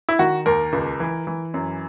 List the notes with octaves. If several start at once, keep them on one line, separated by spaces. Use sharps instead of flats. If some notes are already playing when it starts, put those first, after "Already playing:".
E4
D#3 F#4
D#2 A#4
C#2
E3
E3
F#2